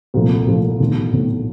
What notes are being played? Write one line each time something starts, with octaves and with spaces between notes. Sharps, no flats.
C2 A#2 F3 A3
C2 A#2 F3 A3
B1 A2 E3
B1 A2 E3